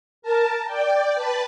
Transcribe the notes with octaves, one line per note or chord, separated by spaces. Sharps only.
A#4 A5
D5 G5
B4 A5 B5